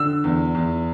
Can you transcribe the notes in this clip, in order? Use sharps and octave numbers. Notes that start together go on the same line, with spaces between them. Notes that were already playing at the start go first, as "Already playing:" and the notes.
Already playing: D3 E6
E2
E2